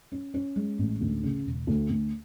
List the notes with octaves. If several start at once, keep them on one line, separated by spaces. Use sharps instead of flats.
C#4
C#4
G#3
A1
D2
C#3
E1
D2
D2